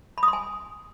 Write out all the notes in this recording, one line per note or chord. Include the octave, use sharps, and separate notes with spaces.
B5
D#6
C6
G#5